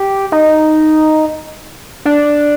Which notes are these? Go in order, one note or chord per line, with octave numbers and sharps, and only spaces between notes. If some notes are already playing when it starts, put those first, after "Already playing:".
Already playing: G4
D#4
D4